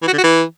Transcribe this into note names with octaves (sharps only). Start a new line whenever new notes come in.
E3
F#4
D3
F#4
E3